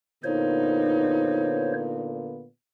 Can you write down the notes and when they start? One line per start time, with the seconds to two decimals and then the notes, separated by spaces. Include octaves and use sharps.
0.24 A#2 D3 B3 D#4 C5 C#5